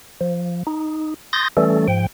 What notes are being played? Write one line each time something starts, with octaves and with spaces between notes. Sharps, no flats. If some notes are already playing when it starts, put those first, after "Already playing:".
F3
D#4
C6 D#6 G6 A6 A#6
E3 G3 A3 C#4 A4
G#2 F3 G5